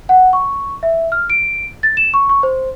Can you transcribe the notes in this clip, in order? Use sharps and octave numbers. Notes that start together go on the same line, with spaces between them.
F#5
C#6
E5
F6
D7
A6
E7
C#6
C#6
C5